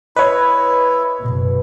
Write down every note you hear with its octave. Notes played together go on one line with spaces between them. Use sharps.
E4 B4 C#5 D#5
F#1 B2